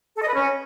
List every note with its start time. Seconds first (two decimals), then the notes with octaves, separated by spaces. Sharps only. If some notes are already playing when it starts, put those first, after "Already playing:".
0.16 A4
0.22 D#5
0.28 B4
0.34 C#4